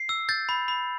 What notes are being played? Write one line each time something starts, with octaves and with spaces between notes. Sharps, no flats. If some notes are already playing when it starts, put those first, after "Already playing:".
Already playing: C7
E6
G6 A6
B5
B5